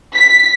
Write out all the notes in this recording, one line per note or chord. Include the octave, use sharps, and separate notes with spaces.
B6